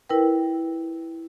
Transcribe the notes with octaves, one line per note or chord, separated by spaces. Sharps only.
E4 A#4 B4 G5